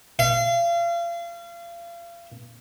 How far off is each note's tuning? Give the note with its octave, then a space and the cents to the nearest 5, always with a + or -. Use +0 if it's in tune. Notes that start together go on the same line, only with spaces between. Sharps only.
F5 -35